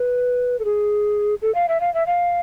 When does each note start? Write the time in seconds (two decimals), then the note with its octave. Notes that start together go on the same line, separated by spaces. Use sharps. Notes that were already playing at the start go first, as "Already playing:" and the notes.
Already playing: B4
0.59 A4
0.65 G#4
1.42 A4
1.55 F5
1.69 E5
1.81 F5
1.94 E5
2.07 F5